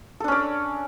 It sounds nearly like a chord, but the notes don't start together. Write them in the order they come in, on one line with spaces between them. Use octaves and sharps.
A4 D4 C#4 D5